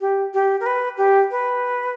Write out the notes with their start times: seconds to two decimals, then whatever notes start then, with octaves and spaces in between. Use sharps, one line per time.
0.01 G4
0.34 G4
0.60 A#4
0.66 B4
0.97 G4
1.31 B4